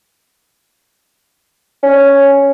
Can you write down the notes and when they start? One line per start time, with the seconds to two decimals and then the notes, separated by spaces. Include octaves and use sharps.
1.83 C#4